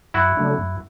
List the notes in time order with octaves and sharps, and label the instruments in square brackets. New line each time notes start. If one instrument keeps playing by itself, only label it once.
[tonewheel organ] F#2 [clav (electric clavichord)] E4 F#4
[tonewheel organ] C#3 F#3 A3 D4
F#2